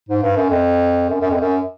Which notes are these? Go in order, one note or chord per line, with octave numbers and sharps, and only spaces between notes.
G#2
G2
F#2
F2
F#2
F#2
F2
F#2